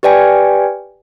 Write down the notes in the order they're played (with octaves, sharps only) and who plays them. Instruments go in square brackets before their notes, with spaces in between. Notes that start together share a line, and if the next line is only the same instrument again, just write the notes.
[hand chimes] G4 B4 D5 G5 G#5